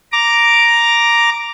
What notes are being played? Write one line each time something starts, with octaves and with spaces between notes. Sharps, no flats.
A#5 D6